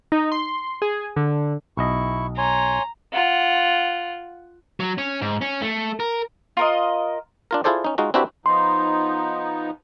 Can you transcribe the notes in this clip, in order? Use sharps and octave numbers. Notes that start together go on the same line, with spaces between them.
D#4
C6
G#4
D3
B1 E4 D#5 C#6
C#5 G#5 A#5 C6
F4 F#5
F#3
C#4
G#2
C#4
A3
A#4
F4 A#4 D#5
D4 F4 A#4
E4 F4 G#4 A4 C5 D5
C#4 D#4
G#3 D#4 F4 F#4
C4 D4 E4 F#4 G4 B4
F3 B3 D#4 C6